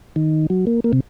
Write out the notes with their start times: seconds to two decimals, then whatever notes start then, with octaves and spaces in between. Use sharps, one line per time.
0.16 D#3
0.50 F#3
0.67 A#3
0.84 A#3
0.93 C3